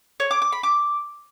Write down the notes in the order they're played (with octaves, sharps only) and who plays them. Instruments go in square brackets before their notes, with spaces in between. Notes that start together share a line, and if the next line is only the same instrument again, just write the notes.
[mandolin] C#5
D6
D6
B5
D6